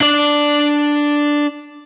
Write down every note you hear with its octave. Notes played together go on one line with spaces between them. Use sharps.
D4 D5